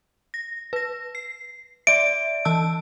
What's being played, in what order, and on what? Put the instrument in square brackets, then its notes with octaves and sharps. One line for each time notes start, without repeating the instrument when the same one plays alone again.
[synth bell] A#6
B4 A#6
C7
[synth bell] D5 E5 [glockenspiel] D7
[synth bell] E3 A5 E6